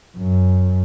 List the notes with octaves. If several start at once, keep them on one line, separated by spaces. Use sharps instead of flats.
F#2